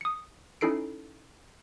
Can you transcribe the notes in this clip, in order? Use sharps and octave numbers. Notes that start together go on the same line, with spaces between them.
D#6 C#7
C#4 D#4 E4 A4 C7 D7